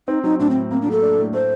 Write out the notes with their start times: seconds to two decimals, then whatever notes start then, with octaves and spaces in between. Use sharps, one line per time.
0.08 C4 D#4
0.24 F#3 D#4
0.39 A2 D4
0.50 C4
0.55 A2
0.71 A#3 C4
0.82 D4
0.86 F#3
0.91 A4
1.02 D4
1.18 A2
1.33 A3 C5